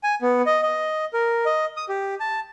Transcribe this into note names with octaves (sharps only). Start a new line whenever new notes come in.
G#5
B3
D#5
D#5
A#4
D#5
D#6
G4
A5